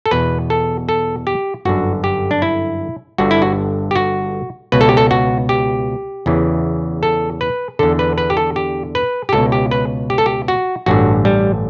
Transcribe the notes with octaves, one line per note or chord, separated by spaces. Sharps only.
A4
E2 B2 B4
A4
A4
G4
G1 F#2 D3 F#4
G4
D4
E4
G1 G2 D3 F#4
E4
F#4
G4
F#4
C#2 B2 B4
A4
G4
A4
F#4
G4
E2 C#3 E3
A4
B4
E2 D3 A4
B4
B4
G4
A4
G4
B4
G4
C#2 B2 A4
G4
B4
G4
A4
G4
F#4
A1 G2 D3 F#4
G3